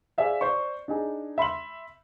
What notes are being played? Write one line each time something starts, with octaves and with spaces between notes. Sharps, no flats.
G#4 C5 D5 E5 F5
C5 D5 C#6
D4 D#4 G#4
E5 B5 C6 F#7